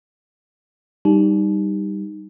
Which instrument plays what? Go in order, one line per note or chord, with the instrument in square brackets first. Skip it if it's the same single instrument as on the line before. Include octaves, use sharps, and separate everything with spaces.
[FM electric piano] G3 [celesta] D#4